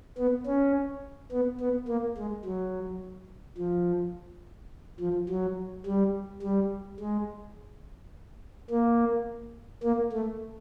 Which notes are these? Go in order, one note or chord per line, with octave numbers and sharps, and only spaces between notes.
B3
C#4
B3
B3
A#3
G#3
F#3
F3
F3
F#3
G3
G3
G#3
A#3
A#3
A3